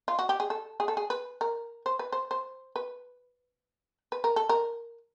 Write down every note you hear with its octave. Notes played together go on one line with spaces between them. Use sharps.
F4
F#4
G4
G#4
A4
G#4
A4
G#4
B4
A#4
C5
B4
C5
C5
B4
B4
A#4
A4
A#4